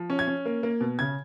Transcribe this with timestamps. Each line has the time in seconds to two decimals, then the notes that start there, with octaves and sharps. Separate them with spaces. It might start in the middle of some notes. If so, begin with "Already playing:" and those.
Already playing: F3
0.10 C#4
0.19 G#6
0.28 C#4
0.45 A#3
0.63 A#3
0.81 B2
0.99 C#3 G#6